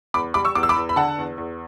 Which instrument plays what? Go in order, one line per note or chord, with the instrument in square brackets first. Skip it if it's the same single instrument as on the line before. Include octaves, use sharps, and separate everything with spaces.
[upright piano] E2 B5 D6
G3 B5 D6
C#6 E6
E2 D6
E6
B5 D6
E2
B5
D3 F#5 A5
E2
E2